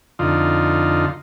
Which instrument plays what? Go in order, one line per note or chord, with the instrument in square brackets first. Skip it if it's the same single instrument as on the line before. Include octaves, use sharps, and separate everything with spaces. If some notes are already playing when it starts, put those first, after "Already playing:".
[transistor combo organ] F2 D3 D#4 F4